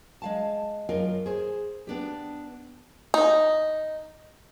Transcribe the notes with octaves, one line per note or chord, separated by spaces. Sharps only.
G#3 F5 A5
F#2 F4 A#4 D#5 F5
G#4 C5
B3 D4 G4
D#4